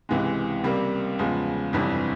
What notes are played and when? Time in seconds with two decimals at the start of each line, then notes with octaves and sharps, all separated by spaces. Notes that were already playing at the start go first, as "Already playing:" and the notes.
0.09 C#2 C3 E3 G#3
0.64 C#2 C3 G3 A#3
1.19 E2 C#3 F3 G#3
1.73 G1 F2 C3 E3 G3